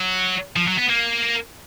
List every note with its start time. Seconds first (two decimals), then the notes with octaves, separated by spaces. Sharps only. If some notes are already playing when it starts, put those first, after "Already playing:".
Already playing: F#3
0.56 F3
0.68 F#3
0.78 B3
0.90 A#3